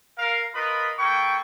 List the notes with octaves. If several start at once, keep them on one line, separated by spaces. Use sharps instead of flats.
A#4 F5
F4 A#4 B4 D#5 B5
A#3 A4 G5 B5 C#6